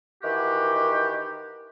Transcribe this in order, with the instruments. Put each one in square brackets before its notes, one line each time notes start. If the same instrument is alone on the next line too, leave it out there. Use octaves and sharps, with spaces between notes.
[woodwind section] D#3 E3 F#4 G4